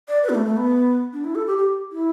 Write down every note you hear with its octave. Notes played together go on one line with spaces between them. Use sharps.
D5
B4
B3
A3
A3
B3
D4
E4
A4
G4
G4
E4